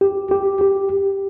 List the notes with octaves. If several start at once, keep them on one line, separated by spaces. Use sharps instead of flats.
G4
G4
G4